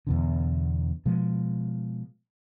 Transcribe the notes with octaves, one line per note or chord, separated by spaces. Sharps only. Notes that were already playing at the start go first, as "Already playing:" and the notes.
E2 B2 D3
B2 F3 G#3